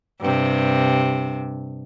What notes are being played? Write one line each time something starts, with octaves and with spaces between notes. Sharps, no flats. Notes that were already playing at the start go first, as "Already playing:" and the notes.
G2 C3